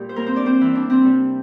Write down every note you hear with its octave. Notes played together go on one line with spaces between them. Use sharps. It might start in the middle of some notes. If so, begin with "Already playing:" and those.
Already playing: A#2 G3 G4
C5
A#3 A#4
C4 C5
D4 D5
C4 C5
E3 E4
D4
C4
C3 G3